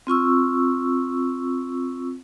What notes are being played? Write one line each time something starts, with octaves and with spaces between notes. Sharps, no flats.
C4 F4 C#6 E6